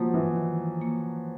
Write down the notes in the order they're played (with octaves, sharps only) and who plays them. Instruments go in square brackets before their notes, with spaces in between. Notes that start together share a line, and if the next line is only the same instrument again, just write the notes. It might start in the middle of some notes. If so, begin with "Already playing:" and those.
Already playing: [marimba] D#3 A#3 [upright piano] F3 F#3
[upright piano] E3
[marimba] D#3
A#3